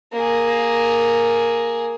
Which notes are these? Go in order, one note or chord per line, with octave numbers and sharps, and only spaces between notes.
A#3 G#4